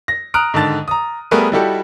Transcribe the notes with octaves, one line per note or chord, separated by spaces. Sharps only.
A#6
A#5 D#6 F6 F#6 D7
G#2 D3 D#3 A5 A6
A#5 D#6
G3 A3 B3 G#4 A#4 B4
G3 D#4 E4 F#4 G4 A4